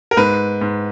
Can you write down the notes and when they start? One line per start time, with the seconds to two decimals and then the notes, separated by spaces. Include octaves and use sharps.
0.11 A#4
0.17 G#2 B4
0.61 G#2